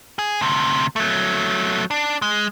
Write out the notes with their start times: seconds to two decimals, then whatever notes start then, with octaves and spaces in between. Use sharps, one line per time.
0.19 G#4
0.41 D2 C3
0.96 F#3 A3
1.91 D4
2.22 G#3